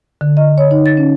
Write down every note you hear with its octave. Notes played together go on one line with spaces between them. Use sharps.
D3
D#5
C#5
D#4
A6
C#4